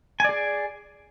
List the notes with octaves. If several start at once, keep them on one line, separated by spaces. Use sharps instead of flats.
G#4 D5 G#5